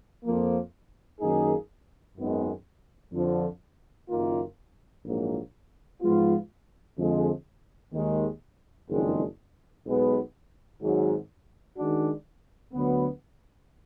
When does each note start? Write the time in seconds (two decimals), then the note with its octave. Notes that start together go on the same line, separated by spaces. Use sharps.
0.25 F2 F3 A#3
1.20 F#2 D#3 A#3 D#4 G#4
2.16 G#1 F#2 D#3 G#3 B3
3.12 F2 D3 F3
4.08 F#1 F#2 D#3 A#3 F4
5.04 A#1 G#2 F#3 A#3
6.01 G#2 F3 G#3 B3 F4
6.97 F2 D3 F3 G#3
7.93 D#2 D#3 G#3
8.89 F#1 F2 D#3 G#3 D4
9.85 B1 B2 G#3 B3
10.81 G#1 G#2 F#3
11.77 D#3 G#3 D4 F#4
12.73 D2 D3 F#3 B3